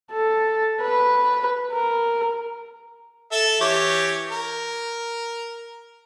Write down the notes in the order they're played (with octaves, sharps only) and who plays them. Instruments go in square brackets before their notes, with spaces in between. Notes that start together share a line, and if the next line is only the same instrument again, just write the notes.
[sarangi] A4
B4
A#4
[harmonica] A4 E5
E3 G4 C#5
A#4